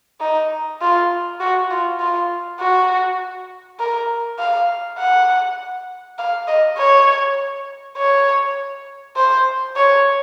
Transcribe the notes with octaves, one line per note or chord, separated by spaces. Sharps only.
D#4
F4
F#4
F4
F4
F#4
A#4
F5
F#5
F5
D#5
C#5
C#5
C5
C#5